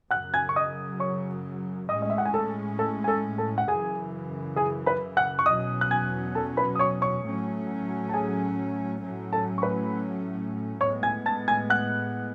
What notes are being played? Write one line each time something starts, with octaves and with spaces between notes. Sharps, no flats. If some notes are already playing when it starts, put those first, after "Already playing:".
F#2 C#3 F#3 F#5 F#6
G#5 G#6
C#6
D#5 D#6
C#5 C#6
A2 G#3 C#4 D#5 D#6
D#5
E5
F#5
G#5
A4 A5
A4 A5
G#5
A4 A5
A4 A5
F#5
F#2 C#3 E3 G#4 G#5
G#4 G#5
B4 B5
F#5 F#6
C#6
E2 B2 F#3 C#4 D#5 D#6
F#6
G#5 G#6
A4 A5
B4 B5
D#6
C#5 C#6
C#5 C#6
A2 F#3 A3 C#4
A5
G#4 G#5
A2 F#3 A3 C#4
A4 A5
C#6
B4 B5
A2 G#3 B3 C#5 C#6
G#5 G#6
A5 A6
G#5 G#6
F#5 F#6